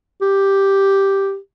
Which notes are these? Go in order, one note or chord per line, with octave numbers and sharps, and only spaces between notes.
G4